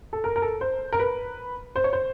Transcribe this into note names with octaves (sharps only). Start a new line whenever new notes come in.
A4
A#4
A#4
A4
C5
A#4
B4
C5
C#5
C5